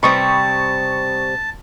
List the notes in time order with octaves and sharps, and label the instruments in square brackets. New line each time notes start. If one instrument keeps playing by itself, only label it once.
[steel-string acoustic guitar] C3 G3 C4 [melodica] A5 [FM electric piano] B5 C#6 D#6